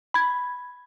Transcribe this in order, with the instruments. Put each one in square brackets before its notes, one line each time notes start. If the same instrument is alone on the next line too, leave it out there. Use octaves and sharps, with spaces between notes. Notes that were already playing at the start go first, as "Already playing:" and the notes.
[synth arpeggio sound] B5 G#6